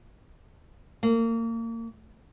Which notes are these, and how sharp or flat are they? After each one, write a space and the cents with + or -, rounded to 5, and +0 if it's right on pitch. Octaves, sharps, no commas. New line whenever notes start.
A#3 -30